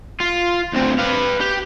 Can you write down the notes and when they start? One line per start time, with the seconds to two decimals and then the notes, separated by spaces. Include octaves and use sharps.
0.20 F4
0.74 D2 C4
0.99 B4 F5
1.41 G4